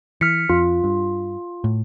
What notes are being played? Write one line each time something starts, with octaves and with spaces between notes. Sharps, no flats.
E3 F6 B6 C#7
F2 F4
G2
A2